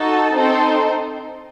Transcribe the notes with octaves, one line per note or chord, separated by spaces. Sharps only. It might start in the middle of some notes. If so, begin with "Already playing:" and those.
Already playing: D#4 F#4 A4 A5
C4 D#4 A4 C5